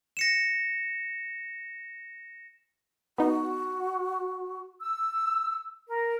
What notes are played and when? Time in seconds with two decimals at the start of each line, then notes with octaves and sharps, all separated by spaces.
0.17 A#6 C#7 E7
3.18 B3 D#4 F#4
4.80 E6
5.87 A#4